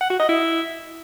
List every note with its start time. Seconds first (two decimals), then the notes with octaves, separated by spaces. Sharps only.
0.01 F#5
0.10 F#4
0.19 D#5
0.29 E4